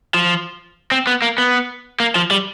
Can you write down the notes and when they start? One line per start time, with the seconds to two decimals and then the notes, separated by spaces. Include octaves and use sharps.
0.14 F3
0.92 C4
1.07 B3
1.22 A#3
1.38 B3
2.00 A#3
2.15 F3
2.31 G3